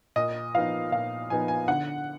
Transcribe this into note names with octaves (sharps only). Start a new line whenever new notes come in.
A#2 D#5
F3 B3 D#4 F5
A#2 F5
F3 B3 D#4 G#5
G#5
D3 F#5